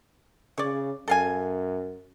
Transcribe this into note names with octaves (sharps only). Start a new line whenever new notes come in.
C#3 C#5 D5
F#2 A4 F5 G#5